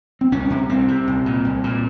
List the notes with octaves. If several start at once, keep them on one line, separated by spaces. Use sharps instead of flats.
C4
C2 C#4
C3
C2 C4
C3
C2
A#2
C2
A#2